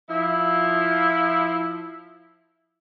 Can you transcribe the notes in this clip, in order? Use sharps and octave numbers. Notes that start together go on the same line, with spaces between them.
F3 E4